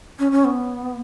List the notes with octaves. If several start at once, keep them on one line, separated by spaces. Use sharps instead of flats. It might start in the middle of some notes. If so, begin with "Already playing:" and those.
C#4
C#4
B3